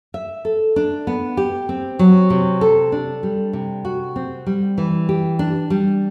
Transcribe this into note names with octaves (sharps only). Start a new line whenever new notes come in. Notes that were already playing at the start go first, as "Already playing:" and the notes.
E5
A4
D4
B3
G4
C4
F#3
C3
A4
D4
G3
C3
F#4
C4
G3
E3
G4
D4
G3